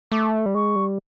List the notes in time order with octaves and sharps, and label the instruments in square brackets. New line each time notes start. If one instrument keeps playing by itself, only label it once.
[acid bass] A3 [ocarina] D6
[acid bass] G3
[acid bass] G#3 [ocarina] C#6
[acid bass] G3